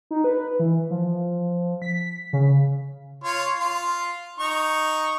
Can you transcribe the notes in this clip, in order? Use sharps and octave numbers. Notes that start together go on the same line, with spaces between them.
D#4
B4
E3
F3
B6
C#3
F4 C#5
F4
D#4 C#6